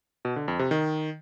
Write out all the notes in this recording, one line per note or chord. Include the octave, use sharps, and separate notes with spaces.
B2
D3
F2
C3
D#3